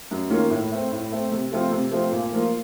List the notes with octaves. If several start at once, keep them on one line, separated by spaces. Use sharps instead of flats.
F#2
D#3 A#3 C#4 F4
A2
A3 C4
A2
A3 C4
C3
F3 A3 C4 F4
C3
F3 A3 C4 F4
A#2
F3 A#3 F4